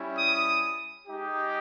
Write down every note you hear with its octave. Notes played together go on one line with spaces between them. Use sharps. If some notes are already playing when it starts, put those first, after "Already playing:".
Already playing: G3 C#4 E4 G4
D#6
G#3 D#4 G4